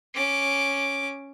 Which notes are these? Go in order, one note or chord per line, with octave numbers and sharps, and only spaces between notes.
C#4 D6